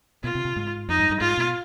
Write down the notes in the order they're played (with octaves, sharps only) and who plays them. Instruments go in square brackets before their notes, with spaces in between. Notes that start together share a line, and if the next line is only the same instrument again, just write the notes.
[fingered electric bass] B2 [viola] F4
[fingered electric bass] C3
C3
G#2
[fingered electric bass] F2 [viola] D#4
[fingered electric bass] G2
G2
[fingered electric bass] G#2 [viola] F4
[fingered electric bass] B2